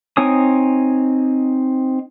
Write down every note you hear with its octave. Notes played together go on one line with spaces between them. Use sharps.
C4 D#4 C#5 G#5 D#6